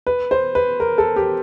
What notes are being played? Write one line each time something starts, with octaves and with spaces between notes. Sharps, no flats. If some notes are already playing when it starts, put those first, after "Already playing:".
B4
C5
B4
A#4
A4
G4